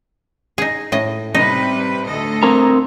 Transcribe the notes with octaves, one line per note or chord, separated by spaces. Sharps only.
D#4 G#4
A2 D#5
C3 G3 D#4 B4
D2 A4 D#5
C4 A#4 A#5